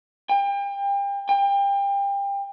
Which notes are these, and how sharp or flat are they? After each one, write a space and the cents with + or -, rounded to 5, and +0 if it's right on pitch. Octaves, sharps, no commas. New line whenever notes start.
G5 +35
G5 +30